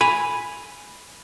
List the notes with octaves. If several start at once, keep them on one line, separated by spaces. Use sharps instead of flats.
G#5 B5